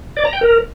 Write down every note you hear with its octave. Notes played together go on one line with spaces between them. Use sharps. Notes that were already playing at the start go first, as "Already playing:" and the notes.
D5
A#5
G5
A#4